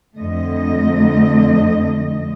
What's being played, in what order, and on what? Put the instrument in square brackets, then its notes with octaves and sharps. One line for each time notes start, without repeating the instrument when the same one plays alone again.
[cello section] F2 D3 A3 D#5